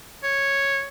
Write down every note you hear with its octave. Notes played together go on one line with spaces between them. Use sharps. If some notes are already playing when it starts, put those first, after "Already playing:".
C#5